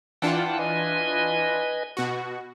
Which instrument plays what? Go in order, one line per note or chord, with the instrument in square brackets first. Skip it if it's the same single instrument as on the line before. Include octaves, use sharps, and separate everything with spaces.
[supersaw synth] E3 D4 F4 [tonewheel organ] F#5 G5 A5
[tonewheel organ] B4 D#5 G#5
[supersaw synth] B2 F#4